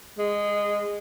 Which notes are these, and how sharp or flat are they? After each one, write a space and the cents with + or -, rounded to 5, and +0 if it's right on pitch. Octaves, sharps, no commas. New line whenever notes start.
G#3 -15